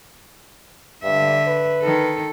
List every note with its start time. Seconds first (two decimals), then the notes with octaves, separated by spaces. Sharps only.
1.04 G2 D3 E5
1.47 B4
1.81 D#3 A4